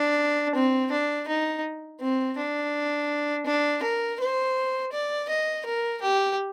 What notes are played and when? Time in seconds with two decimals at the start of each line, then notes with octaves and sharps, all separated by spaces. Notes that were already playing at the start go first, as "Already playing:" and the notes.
Already playing: D4
0.55 C4
0.92 D4
1.28 D#4
2.01 C4
2.37 D4
3.46 D4
3.83 A#4
4.20 C5
4.93 D5
5.29 D#5
5.65 A#4
6.02 G4